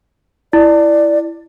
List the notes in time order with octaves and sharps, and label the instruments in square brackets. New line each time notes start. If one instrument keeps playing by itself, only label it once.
[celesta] E4 [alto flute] D5